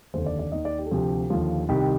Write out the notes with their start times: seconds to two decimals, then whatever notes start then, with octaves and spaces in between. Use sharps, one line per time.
0.14 F1 D#2 D3 C5
0.26 D5
0.39 D5
0.52 D#2 D#3 D#5
0.65 D5
0.79 G4
0.86 A4
0.91 D2 C3 F3 G4
1.30 D#2 D3 F3 F4
1.69 C2 C3 D#3 G4